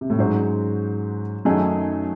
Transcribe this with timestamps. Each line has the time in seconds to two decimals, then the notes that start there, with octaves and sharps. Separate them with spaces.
0.01 C3
0.10 A2
0.19 G#2 F#3 C#4 F#4 C5
1.45 F#2 D#3 F#3 A3 D#4 G#4